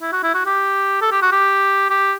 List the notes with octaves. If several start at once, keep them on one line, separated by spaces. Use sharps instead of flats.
E4
F#4
E4
F#4
G4
A4
G4
F#4
G4
G4